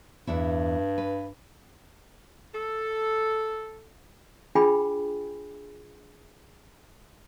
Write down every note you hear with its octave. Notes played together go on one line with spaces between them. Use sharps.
E2 G2 D4 E4
B4
A4
D4 F4 G#4 G5 G#5 B5